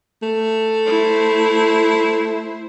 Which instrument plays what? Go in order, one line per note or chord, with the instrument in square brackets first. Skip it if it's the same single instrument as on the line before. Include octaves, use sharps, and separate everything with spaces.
[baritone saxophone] A3
[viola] E4 C5